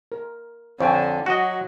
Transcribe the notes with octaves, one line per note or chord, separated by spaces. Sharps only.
A#4
F2 D3 C#5 G5 G#5
F#3 F#4 D#5